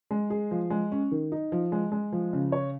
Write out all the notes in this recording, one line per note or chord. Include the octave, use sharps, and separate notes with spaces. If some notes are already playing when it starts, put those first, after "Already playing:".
G#3
G#4
F3
G#3
C#4
D#3
D#4
F3
G#3
G#3
F3
C#3
C#5